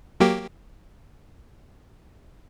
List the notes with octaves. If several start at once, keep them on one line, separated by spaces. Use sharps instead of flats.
F#3 A#3 G4